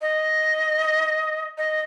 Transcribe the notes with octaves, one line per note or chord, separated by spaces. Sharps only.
D#5
D#5